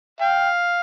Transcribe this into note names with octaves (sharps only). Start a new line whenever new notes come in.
F5 G5